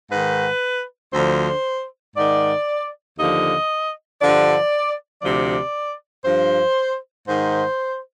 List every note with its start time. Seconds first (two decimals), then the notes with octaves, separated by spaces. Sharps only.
0.11 G#2 D#3 B4
1.13 D2 D3 F3 C5
2.16 G#2 D#3 D5
3.18 D#2 D3 F3 D#5
4.21 G2 D3 F3 D5
5.22 D2 C3 F3 D5
6.25 G2 F3 C5
7.27 G#2 D#3 C5